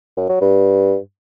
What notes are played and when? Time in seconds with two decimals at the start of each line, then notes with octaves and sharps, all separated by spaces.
0.17 F#2
0.29 F#3
0.41 G2